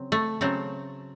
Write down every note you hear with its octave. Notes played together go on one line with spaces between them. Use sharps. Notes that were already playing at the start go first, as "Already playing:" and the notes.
Already playing: C#3 F#3 C4
A3
C#3 F#3 A3 C4